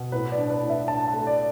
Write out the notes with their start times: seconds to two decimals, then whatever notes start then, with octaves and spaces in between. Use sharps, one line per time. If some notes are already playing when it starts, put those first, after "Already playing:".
Already playing: B2
0.12 A2 B4
0.32 D5
0.38 D4
0.50 B4
0.63 A2
0.69 E5
0.88 D4 A5
1.08 A5
1.14 A3
1.27 D5